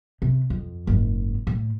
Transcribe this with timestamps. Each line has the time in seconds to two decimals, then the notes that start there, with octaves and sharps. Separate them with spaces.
0.22 C3
0.50 F2
0.87 F#1 G#2
1.47 A2